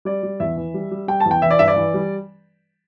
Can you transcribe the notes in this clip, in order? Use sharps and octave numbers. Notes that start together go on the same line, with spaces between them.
G3 D5
G3
E2 E5
E3
G3
G3
G3 G5
A5
E2
G5
E3 E5
D5
G2 E5
D5
E3
G3